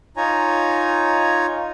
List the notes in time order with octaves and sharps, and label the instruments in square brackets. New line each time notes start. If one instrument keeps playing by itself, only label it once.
[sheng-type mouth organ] D#4 F4 C#5 G#5 A#5